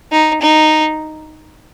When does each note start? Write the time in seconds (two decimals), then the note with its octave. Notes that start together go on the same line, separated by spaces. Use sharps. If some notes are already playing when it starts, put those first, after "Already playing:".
0.12 D#4
0.42 D#4